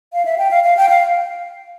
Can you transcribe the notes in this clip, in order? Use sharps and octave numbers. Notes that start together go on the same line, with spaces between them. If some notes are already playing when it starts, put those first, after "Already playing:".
F5
E5
G5
F5
F5
G5
F5